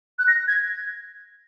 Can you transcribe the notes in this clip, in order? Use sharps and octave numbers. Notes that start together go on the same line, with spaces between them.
F#6
A#6
G#6